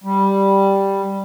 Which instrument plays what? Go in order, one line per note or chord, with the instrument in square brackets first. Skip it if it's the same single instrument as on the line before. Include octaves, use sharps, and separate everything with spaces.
[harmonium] G3